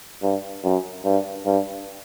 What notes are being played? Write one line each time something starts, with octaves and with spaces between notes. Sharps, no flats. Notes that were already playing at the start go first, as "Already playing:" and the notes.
G2
F#2
G2
G2